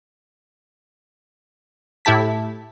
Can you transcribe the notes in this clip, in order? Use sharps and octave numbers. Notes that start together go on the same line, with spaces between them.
A2 E4 G4 A5 B6